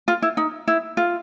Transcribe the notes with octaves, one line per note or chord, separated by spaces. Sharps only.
F4
E4
D#4
E4
F4